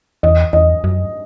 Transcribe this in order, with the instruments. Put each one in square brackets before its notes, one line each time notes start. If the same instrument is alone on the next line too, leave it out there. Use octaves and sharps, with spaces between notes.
[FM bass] E2 [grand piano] D#5
[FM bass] E2 [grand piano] D#5
[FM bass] F#2